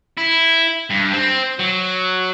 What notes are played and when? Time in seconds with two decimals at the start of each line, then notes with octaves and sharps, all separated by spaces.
0.17 E4
0.90 G2
1.13 C4
1.59 F#3